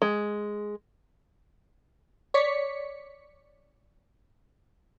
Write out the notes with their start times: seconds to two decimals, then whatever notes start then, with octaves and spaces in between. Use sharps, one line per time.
0.02 G#3
2.34 C#5 D5 B6 C#7